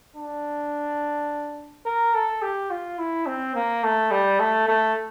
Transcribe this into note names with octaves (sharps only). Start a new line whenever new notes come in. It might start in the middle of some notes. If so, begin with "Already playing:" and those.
D4
A#4
A4
G4
F4
E4
C4
A#3
A3
G3
A3
A3